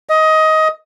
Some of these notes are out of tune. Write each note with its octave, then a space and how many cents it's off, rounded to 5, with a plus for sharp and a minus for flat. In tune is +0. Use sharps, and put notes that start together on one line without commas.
D#5 +15